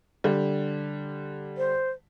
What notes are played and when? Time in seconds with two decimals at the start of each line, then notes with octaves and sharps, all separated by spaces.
0.24 D3 G3
1.57 C5